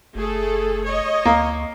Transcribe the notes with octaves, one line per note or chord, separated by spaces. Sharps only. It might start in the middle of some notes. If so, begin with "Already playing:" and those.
F#1 A3 G#4 A4
C#5 D#5
D2 A#3